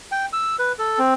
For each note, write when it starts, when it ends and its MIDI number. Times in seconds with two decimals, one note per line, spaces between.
0.12 0.26 79
0.33 0.56 88
0.59 0.72 71
0.79 0.99 69
0.99 1.14 60